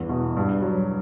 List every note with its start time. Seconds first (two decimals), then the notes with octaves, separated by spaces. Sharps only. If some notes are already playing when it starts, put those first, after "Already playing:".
Already playing: E2 G2 E3
0.09 B2
0.37 G2
0.62 F#3